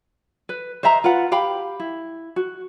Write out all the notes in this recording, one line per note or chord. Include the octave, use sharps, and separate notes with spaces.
B4
C5 D#5 E5 A#5
F4 B4 F#5
G4 F5 G5 B5
E4
F#4